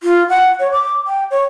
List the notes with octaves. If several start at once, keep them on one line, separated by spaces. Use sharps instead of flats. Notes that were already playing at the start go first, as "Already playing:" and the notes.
F4
F#5
C#5
D6
G5
C#5